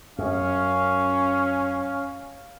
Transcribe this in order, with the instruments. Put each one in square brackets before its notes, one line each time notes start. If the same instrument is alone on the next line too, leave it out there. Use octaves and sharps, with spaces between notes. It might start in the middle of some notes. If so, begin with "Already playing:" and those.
[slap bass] F#2 [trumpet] C#4 [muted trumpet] F5